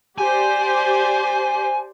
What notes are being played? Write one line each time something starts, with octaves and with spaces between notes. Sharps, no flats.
G4 C5 D5 G#5